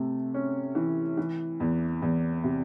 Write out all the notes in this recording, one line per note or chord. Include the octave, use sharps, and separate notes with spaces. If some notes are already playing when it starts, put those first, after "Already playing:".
Already playing: C3 A3
C#4
E3
E3
E2
E2
C3